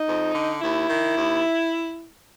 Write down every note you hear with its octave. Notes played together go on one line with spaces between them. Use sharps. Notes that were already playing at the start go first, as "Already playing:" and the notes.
Already playing: D#4
F2
D3
D#2 E4
D#3
D#2